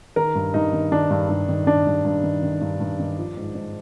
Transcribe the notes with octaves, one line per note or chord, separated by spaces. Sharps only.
D#3 A#4
G2
G2 D#4
D#3
D#3 D4
G2
G2
D#3
D#3 D4
G2
G2
D#3
D#3
G2
G2
D#3
F3
G#2
G#2